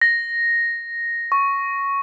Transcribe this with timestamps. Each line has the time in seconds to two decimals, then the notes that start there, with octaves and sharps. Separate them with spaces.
0.02 A#6
1.32 C#6